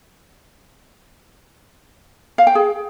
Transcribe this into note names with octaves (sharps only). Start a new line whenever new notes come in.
F5
G5
G#4